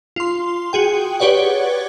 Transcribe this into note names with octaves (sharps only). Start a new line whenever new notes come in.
F4 C6
F#4 G#4 G5
G4 B4 C#5 D5 F#5